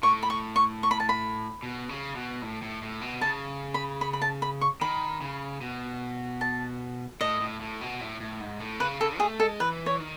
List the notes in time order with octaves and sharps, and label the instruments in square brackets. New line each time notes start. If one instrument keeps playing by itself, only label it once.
[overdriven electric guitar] A2 [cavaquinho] C#6
[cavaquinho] B5
C#6
C#6
C#6
B5
A5
B5
[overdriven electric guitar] B2
C#3
B2
A2
A2
A2
B2
[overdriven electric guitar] C#3 [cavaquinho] A5
[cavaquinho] B5
B5
B5
A5
B5
C#6
[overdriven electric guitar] D#3 [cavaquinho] B5
[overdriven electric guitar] C#3
B2
[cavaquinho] A5
[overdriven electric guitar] A2 [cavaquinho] D#5
[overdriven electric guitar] A2
A2
B2
A2
A2
G#2
A2
[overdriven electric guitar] C#3 [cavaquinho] B4
[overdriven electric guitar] C#3 [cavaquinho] A4
[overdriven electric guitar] A3 [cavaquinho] G#4
[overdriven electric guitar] G#3 [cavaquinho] A4
[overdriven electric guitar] E3 [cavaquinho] B4
[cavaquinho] C#5
[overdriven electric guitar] D#3